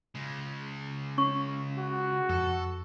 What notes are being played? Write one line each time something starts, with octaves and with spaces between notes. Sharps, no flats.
C#3 G#3
C#4 C#6
F#4
F2 A4